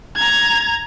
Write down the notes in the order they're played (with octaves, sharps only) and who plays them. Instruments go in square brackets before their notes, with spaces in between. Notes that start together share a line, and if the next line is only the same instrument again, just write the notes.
[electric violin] A#5 G#6